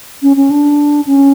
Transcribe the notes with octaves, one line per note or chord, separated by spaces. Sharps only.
C#4
C#4
D4
C#4